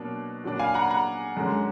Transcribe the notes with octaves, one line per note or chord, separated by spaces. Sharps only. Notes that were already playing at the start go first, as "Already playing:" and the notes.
Already playing: B2 F#3 A#3 D4
A#2 F#3 D4
F5 G#5
F#5 A#5
F#5 A#5
F#2 D3 G#3 D4